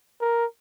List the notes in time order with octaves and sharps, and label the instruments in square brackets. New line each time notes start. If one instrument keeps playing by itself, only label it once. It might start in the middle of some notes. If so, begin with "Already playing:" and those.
[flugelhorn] A#4